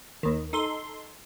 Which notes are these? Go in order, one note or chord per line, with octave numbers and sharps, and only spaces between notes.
D#2 D#3
D#4 A4 C6